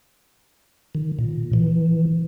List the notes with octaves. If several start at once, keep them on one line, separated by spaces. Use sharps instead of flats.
D#3
A#2
E3